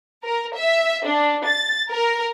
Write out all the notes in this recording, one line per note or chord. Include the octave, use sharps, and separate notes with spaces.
A#4
E5
D4
A6
A#4